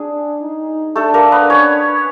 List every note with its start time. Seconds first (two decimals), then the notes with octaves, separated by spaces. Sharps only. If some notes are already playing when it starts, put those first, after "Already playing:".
Already playing: D4 G#4
0.42 D#4
0.96 A3 D4 A4
1.14 A#3 A#4
1.32 B3 B4
1.50 C#4 C#5